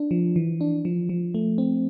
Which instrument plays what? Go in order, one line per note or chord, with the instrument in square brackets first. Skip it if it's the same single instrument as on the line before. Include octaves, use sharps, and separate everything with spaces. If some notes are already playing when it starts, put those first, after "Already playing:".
Already playing: [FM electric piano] D4
F3
E3
D4
F3
F3
A3
C4